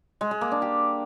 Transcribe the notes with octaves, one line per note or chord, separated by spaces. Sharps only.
G#3
G#3
A#3
D4
G4